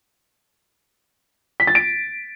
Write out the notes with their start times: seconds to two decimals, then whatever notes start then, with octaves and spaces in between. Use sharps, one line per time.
1.60 B6
1.67 A6
1.75 D7